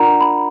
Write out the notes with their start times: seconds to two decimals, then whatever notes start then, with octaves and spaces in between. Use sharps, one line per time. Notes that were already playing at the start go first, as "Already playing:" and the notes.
Already playing: D4 F4 A#4 D5 F#5 A#5
0.21 B5